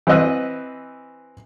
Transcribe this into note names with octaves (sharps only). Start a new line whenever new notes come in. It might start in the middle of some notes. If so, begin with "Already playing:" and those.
E3 C4 B4 D#5 E6 F#6